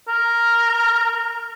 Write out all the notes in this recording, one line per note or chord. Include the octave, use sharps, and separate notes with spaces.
A#4